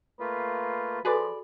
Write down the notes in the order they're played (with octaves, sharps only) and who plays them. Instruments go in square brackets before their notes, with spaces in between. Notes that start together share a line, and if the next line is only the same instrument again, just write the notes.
[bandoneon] A3 A#3 F4 [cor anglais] B4
[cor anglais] F3 [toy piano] F#4 A4 [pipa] G#4 B4 D5